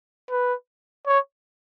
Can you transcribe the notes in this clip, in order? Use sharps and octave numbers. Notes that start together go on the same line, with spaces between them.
B4
C#5